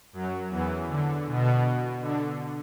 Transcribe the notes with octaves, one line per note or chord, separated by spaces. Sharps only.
F#2 F#3
E2 E3
D3
B2
D3